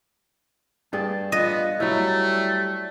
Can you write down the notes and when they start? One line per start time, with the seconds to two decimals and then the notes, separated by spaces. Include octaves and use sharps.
0.93 G2 G#4 G5 A5
1.32 B3 F4 D#5
1.80 F#3 G3 A3 E4